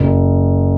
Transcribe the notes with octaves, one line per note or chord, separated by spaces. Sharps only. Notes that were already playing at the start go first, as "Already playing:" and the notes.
Already playing: F#1